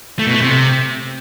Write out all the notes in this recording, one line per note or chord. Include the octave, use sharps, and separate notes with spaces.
A3
B2
A3
C3